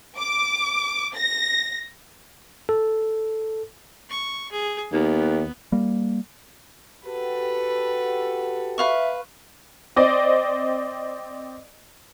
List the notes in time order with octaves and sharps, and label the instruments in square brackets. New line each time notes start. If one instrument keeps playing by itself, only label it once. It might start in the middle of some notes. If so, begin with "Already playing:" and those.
[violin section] D6
A#6
[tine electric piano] A4
[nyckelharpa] C#6
G#4
[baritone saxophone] D#2 [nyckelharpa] B3
[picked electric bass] G3 A#3
[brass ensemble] F#4 G4 A4 [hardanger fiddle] B4
[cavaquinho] B4 F5 C#6 [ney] E5
[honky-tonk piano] C4 D5 D#5